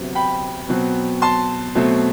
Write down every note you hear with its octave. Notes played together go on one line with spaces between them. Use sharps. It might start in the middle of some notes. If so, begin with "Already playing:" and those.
Already playing: D2 C3 F#3 B3
G5 B5
B2 F#3 C4
A5 C6
B2 F#3 A3 C4